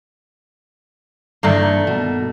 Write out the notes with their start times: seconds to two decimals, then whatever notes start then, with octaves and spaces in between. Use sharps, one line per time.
1.43 G2 D#3 E3 A3 A#3
1.87 B2